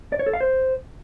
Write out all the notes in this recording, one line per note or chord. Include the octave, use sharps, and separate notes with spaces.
D5
C#5
A4
F5
C5